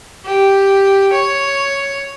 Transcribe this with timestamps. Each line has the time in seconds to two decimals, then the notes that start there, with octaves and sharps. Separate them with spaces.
0.25 G4
1.12 C#5